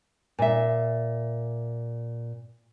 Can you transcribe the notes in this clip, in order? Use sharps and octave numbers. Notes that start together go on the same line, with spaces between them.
A#2 E5